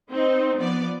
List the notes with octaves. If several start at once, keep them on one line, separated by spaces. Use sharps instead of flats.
C4 D#4
F3 B3 D5